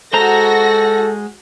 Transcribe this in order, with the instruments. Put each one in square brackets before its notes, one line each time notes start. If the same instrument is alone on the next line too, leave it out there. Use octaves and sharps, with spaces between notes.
[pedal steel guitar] G#3 C5 A#5 [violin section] F#4 A#6 [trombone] A4